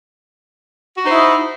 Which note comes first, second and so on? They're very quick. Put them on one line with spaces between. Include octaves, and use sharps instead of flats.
F#4 D#4 C5 E4 D#5